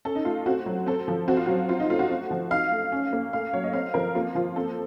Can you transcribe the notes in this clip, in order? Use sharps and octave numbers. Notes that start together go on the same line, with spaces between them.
C#4 A4
D#4
A3 F4
C4 F#4
F#3
C4 A4
F3
C4 F#4
F4
F#3 F#4
C4 F4
D#4
A3 F4
F#4
C4
F3
D#4 F5
A3
C#4
A#3
A3 F5
F#3 C#5
D#5
C4 F5
F3 A#4
A#3 F4
F3 F4
C4 A4